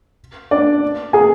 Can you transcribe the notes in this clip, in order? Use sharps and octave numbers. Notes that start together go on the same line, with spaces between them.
D4 D5
G#4 G#5